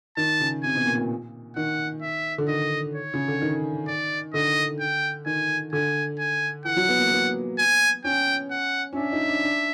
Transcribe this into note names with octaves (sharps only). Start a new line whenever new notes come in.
D#3 A5
C#3
C3 G#5
B2
A#2
A#2
D#3 F#5
E5
D3
D#3 D#5
C#5
C#3
D3
D#3
D5
D3 D#5
G5
D#3 G#5
D3 G#5
G#5
E3 F#5
F#3
B3
A#3
B3
G#5
C#4 G5
F#5
C#4
D4 E5
D#4
D4
D4